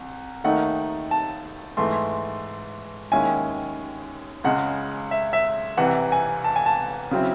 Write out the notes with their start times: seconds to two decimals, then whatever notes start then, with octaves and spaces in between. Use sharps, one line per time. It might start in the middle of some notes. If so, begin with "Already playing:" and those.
Already playing: C2
0.44 D#2 D#3 A3 D#4 F#5
1.11 A5
1.77 G#2 E3 A3 C6
3.12 D#2 D#3 G#3 C#4 E4 G#5
4.44 C#2 C#3 G#3 F#5
5.11 E5
5.33 E5
5.77 C2 C3 E3 F#5
6.12 G#5
6.44 A5
6.56 G#5
6.66 A5
7.11 C#3 F#3 C4 E4